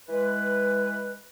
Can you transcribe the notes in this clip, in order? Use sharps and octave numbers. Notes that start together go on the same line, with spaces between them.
E3 G#3 B4